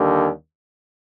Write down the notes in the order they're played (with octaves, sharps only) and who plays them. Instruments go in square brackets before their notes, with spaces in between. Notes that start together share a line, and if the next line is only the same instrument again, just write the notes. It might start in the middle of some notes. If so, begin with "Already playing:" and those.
Already playing: [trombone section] D#2 D3 G3